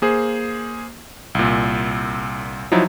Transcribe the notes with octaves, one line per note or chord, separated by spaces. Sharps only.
A#3 G#4 C5
C2 A#2
F3 F#3 D#4 E4